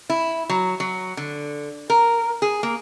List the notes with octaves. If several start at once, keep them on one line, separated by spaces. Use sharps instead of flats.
E4
F#3
F#3
D3
A#4
G#4
A#3